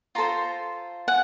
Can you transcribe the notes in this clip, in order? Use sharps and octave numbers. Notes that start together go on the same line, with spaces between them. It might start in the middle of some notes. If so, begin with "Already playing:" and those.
F4 A4 C5 A#5 C6
F#5 G#5